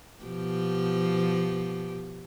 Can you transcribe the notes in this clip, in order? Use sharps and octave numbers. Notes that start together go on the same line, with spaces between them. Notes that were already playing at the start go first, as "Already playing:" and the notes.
B2 F3 G4